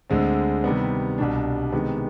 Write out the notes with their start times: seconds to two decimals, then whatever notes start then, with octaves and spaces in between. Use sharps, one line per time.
0.10 D2 D3 G#3 C4
0.64 C3 D#3 G3 B3
1.18 C2 B2 G3 D4
1.72 C3 D#3 G#3 B3